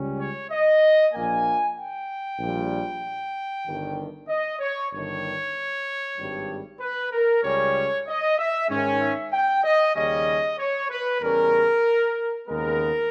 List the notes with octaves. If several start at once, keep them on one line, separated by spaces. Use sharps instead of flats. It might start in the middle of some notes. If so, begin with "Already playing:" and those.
Already playing: C#2 C#3 G3 C#4
C#5
D#5
A#1 A#2 A#3 G#5
G5
A#1 A#2 G3
G1 G2 D#3
D#5
C#5
G1 G2 D#3 C#5
G#1 G2 G3
B4
A#4
C#2 C#3 G3 C#4 C#5
D#5
E5
G#2 D#3 G#3 C#4
E5
G5
D#5
D#2 C#3 G3 C#4 D#5
C#5
B4
E2 C#3 G3 C#4 A#4
D#2 C#3 G#3 B3 A#4